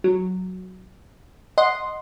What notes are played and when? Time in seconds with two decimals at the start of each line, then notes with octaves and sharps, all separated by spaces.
0.04 F#3
1.58 D#5 F#5 C6